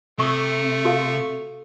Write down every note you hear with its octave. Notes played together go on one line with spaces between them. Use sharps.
C3 A3 C#6 D#6 E6
F#4 A4 F5